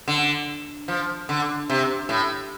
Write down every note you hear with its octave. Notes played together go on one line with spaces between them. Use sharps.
D3
F3
D3
C3
A2